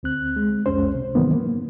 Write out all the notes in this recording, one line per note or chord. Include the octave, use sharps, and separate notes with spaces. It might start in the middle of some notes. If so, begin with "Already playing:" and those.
D2 C4 F#6
G#3
C2 F2 G#3 C#4 C5
C3
G#2 D#3 E3 F#3 A#3 B3
A#3